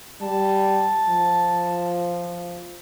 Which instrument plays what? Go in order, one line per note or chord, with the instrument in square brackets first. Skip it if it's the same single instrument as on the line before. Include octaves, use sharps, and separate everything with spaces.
[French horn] G3 [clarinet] A5
[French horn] F3